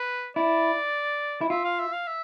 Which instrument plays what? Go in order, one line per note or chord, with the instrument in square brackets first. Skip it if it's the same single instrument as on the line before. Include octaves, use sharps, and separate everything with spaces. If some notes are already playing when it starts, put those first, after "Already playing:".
Already playing: [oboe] B4
[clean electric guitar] E4 [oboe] D5
[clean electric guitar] E4
[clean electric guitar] F4 [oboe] E5
[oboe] F5
E5
F5
E5